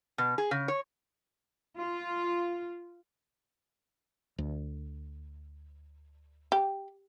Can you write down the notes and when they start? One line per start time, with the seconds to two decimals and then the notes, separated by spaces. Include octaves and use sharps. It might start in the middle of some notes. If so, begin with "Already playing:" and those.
0.18 B2
0.38 G#4
0.51 C#3
0.68 C#5
1.78 F4
4.38 D2
6.52 G4